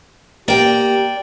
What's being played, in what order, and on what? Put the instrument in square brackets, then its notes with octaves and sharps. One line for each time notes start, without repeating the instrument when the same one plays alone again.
[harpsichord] A#3 [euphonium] G4 [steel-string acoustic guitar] D5 G5